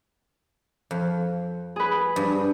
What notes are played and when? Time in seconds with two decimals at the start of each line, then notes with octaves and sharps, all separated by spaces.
0.91 F2
1.76 G#4 B4
2.16 G2